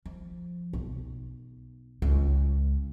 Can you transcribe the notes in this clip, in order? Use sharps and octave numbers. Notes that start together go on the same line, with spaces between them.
F3
B1
C#2